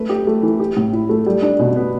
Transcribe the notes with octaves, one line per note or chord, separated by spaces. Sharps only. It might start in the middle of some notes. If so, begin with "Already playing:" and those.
Already playing: A3 B4
G4
A3
E3
G4
A2
E4
A3
G3
D4
B2
B3